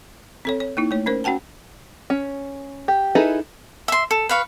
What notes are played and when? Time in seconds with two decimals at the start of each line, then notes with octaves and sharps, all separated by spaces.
0.45 C4 A4 C#5
0.60 C#5
0.77 A#3 D#4 E4
0.91 A3 C#5
1.06 C#4 A#4 C5
1.24 C#4 F#4 F#5 G5 A5
2.10 C#4
2.88 G4
3.15 D#4 E4 G#4 A4 B4
3.88 E5 C6
4.11 A4
4.29 B4 F5 C#6